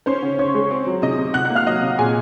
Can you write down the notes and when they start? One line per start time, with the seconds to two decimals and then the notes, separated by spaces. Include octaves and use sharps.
0.06 C#4 C5 C6
0.22 C#3
0.39 C#3 C#5 C#6
0.55 G#3
0.71 C4
0.87 F#3
1.02 C3 D#5 D#6
1.18 C3
1.34 C3 F#5 F#6
1.45 F#5 F#6
1.50 A#3
1.55 F5 F6
1.66 F#3 D#5 D#6
1.82 C3
1.98 A#2 G#4 G#5